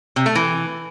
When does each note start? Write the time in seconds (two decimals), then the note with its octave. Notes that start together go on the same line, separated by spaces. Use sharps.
0.16 C3
0.26 A3
0.35 E3